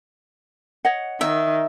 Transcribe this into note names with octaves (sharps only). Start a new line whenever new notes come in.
C#5 D#5 F#5
D#3 E5